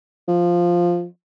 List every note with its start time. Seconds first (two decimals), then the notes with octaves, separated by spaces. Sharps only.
0.28 F3